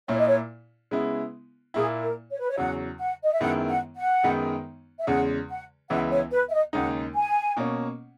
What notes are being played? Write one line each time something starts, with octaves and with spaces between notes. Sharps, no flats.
A#2 A#3 E4 C#5
D#5
C#5
C#3 G#3 B3 E4
A#2 A#3 E4 G#4
A#4
C#5
B4
C#5
E2 C#3 F#3 F#5
F#5
D#5
E5
F#2 D#3 G#3 B3 E4 F#5
F#5
F#5
F#2 D#3 G#3 B3 D#4
E5
E2 C#3 G#3 F#5
F#5
C#2 C#3 E3 B3 E4 F#5
C#5
B4
E5
D#5
D#2 C#3 G#3 D#4 F#5
G#5
B2 A#3 C#4